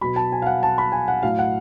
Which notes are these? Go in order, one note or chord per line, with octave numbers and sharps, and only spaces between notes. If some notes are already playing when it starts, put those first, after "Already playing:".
B2 F#3 B5
A5
G#5
F5
F#5
A5
B5
G#5
F#5
A2 F#3 F5
F#5